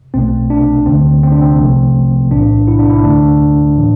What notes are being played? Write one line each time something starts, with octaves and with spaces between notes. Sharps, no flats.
B1 B2 A3 C4
D4
D2 D3 A3 C4
C4
D4
C4
C2 C3 F3 A3
B1 A2 E3 D4
E4
D4
E4
D2 D3 A3 D4
A2 E3